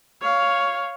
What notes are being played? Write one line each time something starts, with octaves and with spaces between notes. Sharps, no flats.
C#5 F5